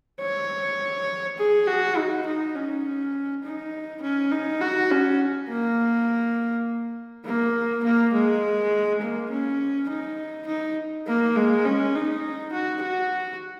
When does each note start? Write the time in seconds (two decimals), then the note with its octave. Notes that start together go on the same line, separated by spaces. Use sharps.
0.21 C#5
1.38 G#4
1.67 F#4
1.97 D#4
2.27 D#4
2.55 C#4
3.43 D#4
4.02 C#4
4.32 D#4
4.61 F#4
4.91 C#4
5.49 A#3
7.25 A#3
7.84 A#3
8.13 G#3
9.01 A#3
9.30 C#4
9.89 D#4
10.47 D#4
11.06 A#3
11.36 G#3
11.65 C#4
11.95 D#4
12.53 F#4
12.82 F#4